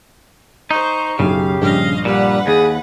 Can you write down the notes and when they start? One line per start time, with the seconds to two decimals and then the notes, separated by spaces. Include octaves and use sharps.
0.71 D#4 C5 C#6
1.19 B1 F#2 C#3 F#3 G4 F5
1.62 A#1 G2 D#5 F5
2.05 A#2 G3 B4 F#5
2.47 D#2 G#4